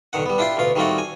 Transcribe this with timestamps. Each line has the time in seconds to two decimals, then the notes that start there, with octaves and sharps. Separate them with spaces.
0.13 B1 D3 D#3 F#5
0.26 G3 B3
0.38 D4 E4 F4 G4 G5 C6
0.57 D2 B2 F4 F5
0.76 D#3 G3 A3 C4 F4 F#4
0.98 G#5